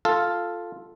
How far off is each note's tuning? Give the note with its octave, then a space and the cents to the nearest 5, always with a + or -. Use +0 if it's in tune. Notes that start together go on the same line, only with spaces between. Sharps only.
F4 +0 A4 +0 F5 +0